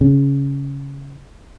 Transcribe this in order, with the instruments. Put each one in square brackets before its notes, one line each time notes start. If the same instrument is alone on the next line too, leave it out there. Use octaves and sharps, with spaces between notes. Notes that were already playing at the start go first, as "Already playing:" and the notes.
[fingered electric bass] C#3